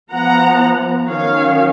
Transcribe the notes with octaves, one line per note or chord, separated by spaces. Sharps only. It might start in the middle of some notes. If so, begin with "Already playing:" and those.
F3 B3 F#5 A#5
D#3 F#3 C#4 C#5 F5